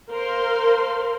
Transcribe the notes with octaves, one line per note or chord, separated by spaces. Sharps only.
A#4 C5 F5 C6